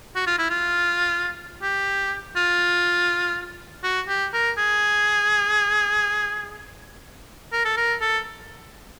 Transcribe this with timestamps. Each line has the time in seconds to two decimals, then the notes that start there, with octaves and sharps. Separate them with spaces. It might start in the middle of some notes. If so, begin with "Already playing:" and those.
0.16 F#4
0.27 F4
0.39 E4
0.50 F4
1.62 G4
2.36 F4
3.83 F#4
4.09 G4
4.33 A#4
4.58 G#4
7.53 A#4
7.65 A4
7.77 A#4
8.01 A4